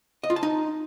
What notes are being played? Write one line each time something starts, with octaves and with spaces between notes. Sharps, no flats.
D#5
F4
A5
D#4